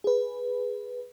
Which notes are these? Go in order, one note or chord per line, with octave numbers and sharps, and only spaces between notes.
G#4 B4